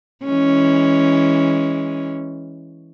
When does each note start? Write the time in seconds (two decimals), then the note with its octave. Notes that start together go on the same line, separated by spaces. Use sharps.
0.24 E3 G#3 C#4